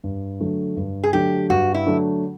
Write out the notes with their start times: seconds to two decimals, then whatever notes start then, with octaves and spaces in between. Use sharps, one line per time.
0.04 G2
0.40 D3 F#3 A3 D4
0.77 G2
1.04 G#4
1.13 D3 F#3 A3 D4 G4
1.50 G2 F#4
1.74 E4
1.86 D3 F#3 A3 D4